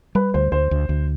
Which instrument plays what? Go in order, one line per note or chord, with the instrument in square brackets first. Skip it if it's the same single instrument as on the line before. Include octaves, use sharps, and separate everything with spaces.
[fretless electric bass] G3 [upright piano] B4
[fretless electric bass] D2 [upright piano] C5
[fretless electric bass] D2 [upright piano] C5
[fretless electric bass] D2
D2